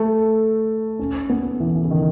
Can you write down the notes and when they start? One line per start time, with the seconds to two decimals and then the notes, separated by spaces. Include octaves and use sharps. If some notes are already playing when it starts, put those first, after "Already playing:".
Already playing: A3
0.99 C#4
1.30 B3
1.60 E3
1.76 E3
1.85 C#3
1.90 D#3